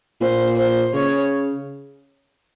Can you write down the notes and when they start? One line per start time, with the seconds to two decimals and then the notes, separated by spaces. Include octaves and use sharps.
0.21 A#2 C5
0.57 C5
0.94 C#3 C#5